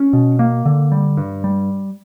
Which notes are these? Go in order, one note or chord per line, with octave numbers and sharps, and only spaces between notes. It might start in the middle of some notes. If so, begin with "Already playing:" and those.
Already playing: C#4
B2
A#3
D3
G3
G2
G3